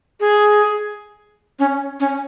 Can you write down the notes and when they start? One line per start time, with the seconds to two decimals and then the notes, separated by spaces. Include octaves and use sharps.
0.20 G#4
1.59 C#4
2.00 C#4